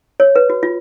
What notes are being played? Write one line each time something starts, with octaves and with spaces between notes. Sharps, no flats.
C#5
B4
F#4
F4